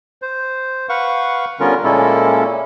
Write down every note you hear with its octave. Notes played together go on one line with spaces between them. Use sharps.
C5
B4 F5 F#5 C#6
D3 G3 B3 C#4 F4 A#4
A#2 G#3 A#3 C#4 E4 A4